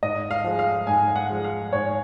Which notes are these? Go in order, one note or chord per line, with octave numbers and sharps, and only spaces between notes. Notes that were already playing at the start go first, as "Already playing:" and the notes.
G#2 D#5
F5
F3 G#3
F5
G#2 G#5
F#5
F3 G#3
F5
G#2 C#5